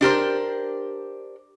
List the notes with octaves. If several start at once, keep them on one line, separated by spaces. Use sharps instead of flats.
D4 G4 A#4 C5